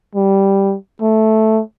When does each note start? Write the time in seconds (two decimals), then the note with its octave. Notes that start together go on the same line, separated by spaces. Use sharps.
0.15 G3
1.02 A3